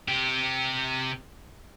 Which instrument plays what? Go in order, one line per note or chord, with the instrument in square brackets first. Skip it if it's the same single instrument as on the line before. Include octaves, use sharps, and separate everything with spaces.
[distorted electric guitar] C3 G4